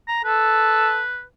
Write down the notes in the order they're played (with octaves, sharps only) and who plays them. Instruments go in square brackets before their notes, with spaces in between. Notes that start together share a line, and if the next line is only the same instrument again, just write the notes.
[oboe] A#5
[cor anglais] A4 [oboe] B4